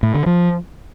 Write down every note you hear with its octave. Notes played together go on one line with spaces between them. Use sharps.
A2
D3
F3